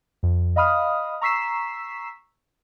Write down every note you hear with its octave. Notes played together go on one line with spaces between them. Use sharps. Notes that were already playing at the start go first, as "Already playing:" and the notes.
F2
D#5 F5 B5 D#6 F6
A#5 C#6 E6 B6 C7 E7